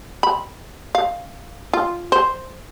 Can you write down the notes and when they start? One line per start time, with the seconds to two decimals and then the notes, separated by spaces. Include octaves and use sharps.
0.23 B5
0.95 F5
1.73 F4
2.12 C5